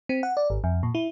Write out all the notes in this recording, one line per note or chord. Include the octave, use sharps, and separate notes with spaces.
C4
F#5
D5
G#1
F2
A#2
E4